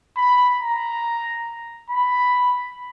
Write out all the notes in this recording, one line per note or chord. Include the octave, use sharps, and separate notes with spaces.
B5
A#5
B5